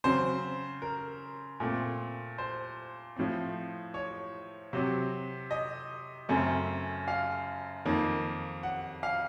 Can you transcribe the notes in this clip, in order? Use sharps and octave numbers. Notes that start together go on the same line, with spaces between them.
C#3 F#3 C4 C5
A#4
A#2 A3 C4
C5
A2 F3 C4
C#5
C3 F#3 C4
D#5
F#2 C#3 A3 C4
F5
F2 D#3 A#3
F#5
F5